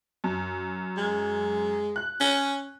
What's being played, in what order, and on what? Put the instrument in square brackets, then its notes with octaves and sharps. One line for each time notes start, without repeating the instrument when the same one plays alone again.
[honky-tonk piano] F#2
[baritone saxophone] G#3
[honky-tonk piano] F#6
[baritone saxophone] C#4